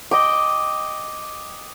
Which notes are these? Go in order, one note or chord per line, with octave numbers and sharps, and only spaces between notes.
D#5 G5 D6